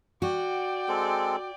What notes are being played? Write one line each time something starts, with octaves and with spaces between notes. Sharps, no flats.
F#4 D5 G5
G#3 C4 A4